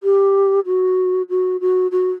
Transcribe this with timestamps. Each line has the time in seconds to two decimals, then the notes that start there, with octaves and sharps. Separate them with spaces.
0.03 G4
0.66 F#4
1.29 F#4
1.61 F#4
1.91 F#4